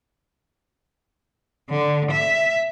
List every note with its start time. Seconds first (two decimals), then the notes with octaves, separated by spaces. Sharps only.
1.70 D3
2.11 E5